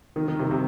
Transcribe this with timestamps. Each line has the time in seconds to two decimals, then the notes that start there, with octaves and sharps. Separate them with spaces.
0.16 D#3
0.28 D#3
0.39 C3
0.51 C3